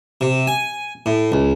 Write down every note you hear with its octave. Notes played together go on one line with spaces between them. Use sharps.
C3
G#5
A2
C#2